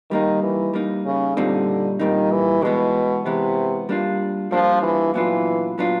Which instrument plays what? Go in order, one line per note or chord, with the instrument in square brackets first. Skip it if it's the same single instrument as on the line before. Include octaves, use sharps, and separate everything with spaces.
[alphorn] D#3 [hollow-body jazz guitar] G3 A#3 D#4
[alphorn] E3
[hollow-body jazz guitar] G3 A#3 D#4
[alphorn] C#3
[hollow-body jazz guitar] A#2 G3 C4 D#4 [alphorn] D3
[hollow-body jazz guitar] A#2 G3 C4 D#4 [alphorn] D#3
[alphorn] E3
[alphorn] B2 [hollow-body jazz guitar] E3 G#3 B3
[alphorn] C3 [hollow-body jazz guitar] E3 G#3 B3
[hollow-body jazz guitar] G3 A#3 D4 F4
[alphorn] F3 [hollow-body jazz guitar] G3 A#3 D4 F4
[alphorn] E3
[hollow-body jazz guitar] A#2 F#3 B3 D4 F4 [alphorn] E3
[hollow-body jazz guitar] A#2 F#3 B3 D4 F4